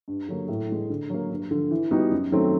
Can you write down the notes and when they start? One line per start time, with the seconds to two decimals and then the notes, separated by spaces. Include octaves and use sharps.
0.08 G2
0.28 D3 F#3 A#3
0.48 A2
0.69 E3 G#3
0.90 D3
1.10 F#3 A#3
1.30 G2
1.51 D3 F3
1.71 E3
1.91 G3 B3 D#4 F#4
2.11 F#2
2.32 D#3 F#3 A3 C4